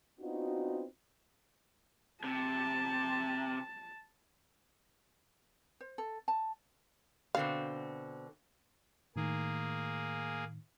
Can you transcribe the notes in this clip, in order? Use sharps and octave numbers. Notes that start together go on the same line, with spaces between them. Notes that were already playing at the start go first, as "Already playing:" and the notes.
B3 C4 D4 D#4 F4 F#4
C3 A5
C5
A4
A5
B2 D3 C4 F5
A2 D#3 A#3 G#4